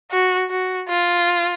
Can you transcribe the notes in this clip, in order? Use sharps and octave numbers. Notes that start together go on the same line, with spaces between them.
F#4
F#4
F4